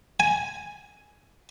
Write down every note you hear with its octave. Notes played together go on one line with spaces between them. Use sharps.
G#5